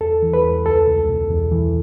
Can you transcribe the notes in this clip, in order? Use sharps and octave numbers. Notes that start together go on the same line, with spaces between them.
E2 A4
E3
B4
E2
C#2 A4
C#2
B2
E2
E3